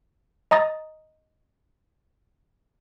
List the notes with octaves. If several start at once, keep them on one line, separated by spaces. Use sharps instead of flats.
D#5 A#5 D#6 A6